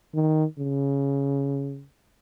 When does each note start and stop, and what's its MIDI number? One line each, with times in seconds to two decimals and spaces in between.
0.14 0.45 51
0.59 1.83 49